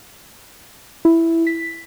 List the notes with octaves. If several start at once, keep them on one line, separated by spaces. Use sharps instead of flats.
E4
B6